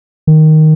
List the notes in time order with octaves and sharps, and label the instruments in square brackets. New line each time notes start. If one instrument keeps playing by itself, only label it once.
[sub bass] D#3